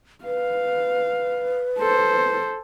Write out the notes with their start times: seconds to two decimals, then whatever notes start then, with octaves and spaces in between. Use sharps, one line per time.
0.24 B4 F5
1.79 A4 C5